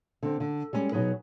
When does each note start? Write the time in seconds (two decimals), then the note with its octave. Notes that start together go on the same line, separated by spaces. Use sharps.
0.23 D3 C4
0.40 D3
0.73 G3 G#3 C#4
0.92 B2 F#3 D#4 G#4 B4